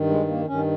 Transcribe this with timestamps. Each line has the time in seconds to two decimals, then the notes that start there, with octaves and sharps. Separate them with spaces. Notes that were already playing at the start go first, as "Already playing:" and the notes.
Already playing: G2 D#3
0.09 G#3
0.28 A#3
0.47 G2 D#3 C#4